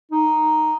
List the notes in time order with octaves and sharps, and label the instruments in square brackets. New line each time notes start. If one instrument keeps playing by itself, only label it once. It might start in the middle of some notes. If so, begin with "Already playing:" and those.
[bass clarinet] D#4